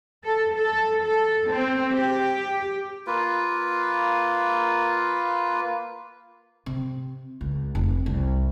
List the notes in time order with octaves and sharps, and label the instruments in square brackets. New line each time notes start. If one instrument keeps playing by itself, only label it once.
[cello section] A4
A4
A4
C4
G4
[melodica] A#3 F4 B4
[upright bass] C3
C#2
F1
C2